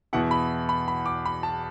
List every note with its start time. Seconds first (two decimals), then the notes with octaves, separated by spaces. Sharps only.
0.13 E2 B2 B3 E4 F#5
0.31 B5
0.69 B5
0.88 B5
1.06 D6
1.25 B5
1.43 A5